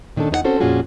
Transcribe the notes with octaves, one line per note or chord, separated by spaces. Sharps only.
A#2 D#3 C#4 D4 A4
E2 D#4 A#4 F#5
C4 C#4 F#4 A4 C5
F2 A#2 C#4 F4 F#4 G#4